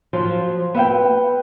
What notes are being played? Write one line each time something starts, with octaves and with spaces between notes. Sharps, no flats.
F3 F#3
B3 E5 F5 G5